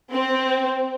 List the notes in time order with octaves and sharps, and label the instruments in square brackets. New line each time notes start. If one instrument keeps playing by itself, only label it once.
[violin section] C4